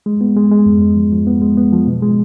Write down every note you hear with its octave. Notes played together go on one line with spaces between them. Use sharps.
G#3
B3
G#3
G#3
F2
G#3
F3
F3
B3
G#3
B3
F3
B2
G#3